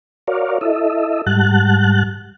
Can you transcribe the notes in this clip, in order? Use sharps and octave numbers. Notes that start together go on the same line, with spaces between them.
F#4 A#4 C#5 D5 F5
E4 A4 D#5 E5
G#2 G3 F#5 A5 F#6